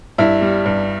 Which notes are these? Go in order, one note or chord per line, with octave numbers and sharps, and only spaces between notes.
G2 E4
G3
G2